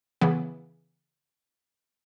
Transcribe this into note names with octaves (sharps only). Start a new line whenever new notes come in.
C#3 E3 B3